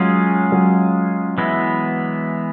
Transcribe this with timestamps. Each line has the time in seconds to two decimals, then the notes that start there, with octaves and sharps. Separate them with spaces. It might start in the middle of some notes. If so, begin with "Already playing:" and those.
Already playing: F#3 G#3 C#4 F4 G#4
0.52 F#3
1.38 E3 G#3 B3 E4